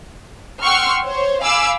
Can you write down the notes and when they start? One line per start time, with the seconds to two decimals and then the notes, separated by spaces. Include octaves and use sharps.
0.61 F#5 G5 C6 C#6 E6 F6
1.04 C5 C#5
1.42 F5 G#5 B5 D6 E6